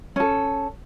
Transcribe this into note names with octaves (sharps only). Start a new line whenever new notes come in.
C#4 A4